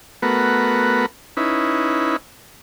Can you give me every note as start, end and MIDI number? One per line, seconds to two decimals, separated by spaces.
0.22 1.06 57
0.22 1.06 59
0.22 1.06 66
0.22 1.06 70
0.22 1.06 71
1.37 2.16 61
1.37 2.16 63
1.37 2.16 64
1.37 2.16 71